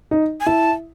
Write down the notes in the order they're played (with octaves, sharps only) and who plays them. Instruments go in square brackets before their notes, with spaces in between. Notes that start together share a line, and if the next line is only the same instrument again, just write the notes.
[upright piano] D#4
[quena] G#5
[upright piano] E4 [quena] A5